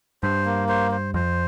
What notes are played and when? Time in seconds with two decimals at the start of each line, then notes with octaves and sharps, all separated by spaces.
0.23 G2 C5
0.46 A#3
0.68 C5
0.91 C5
1.14 F2 C5